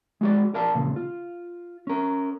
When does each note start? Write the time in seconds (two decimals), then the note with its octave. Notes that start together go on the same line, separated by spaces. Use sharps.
0.21 G#3 F#4 D5
0.54 A#4 D5 F5 A5
0.75 E2 A#2 C#3
0.96 F4
1.87 C#4 A#4